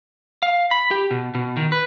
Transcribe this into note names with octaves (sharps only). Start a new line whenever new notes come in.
F5
B5
G4
B2
B2
D#3
B4